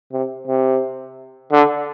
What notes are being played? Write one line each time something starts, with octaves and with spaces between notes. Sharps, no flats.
C3
C3
D3